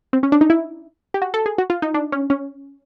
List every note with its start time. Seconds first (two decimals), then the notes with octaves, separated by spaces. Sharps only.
0.13 C4
0.23 C#4
0.32 D4
0.41 D#4
0.50 E4
1.14 G4
1.22 F#4
1.34 A4
1.46 G#4
1.58 F#4
1.70 F4
1.82 D#4
1.94 D4
2.12 C#4
2.30 C#4